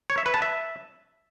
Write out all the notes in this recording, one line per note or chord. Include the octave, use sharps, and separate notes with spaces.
C#5
E5
B4
A5
E5